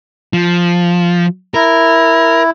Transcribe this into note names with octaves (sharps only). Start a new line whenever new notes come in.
F3
E4 A#4